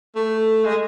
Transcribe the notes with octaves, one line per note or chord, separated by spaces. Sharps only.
A3
G#3